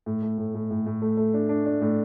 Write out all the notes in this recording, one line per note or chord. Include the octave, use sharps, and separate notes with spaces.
A2
A3
A2
A2
A2
A2
A3
A3
D4
D4
D4
A2